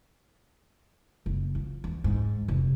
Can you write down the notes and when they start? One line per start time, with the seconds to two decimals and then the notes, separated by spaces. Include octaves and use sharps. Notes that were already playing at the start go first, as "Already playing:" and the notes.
1.26 F#1
1.55 F3
1.84 E2
2.04 G#2
2.48 F1